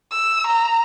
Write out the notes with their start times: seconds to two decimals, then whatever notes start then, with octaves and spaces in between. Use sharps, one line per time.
0.11 E6
0.47 A#5